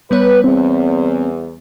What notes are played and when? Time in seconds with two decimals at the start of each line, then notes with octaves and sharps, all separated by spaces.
0.11 G3 B3 B4 C#5
0.44 E2 C4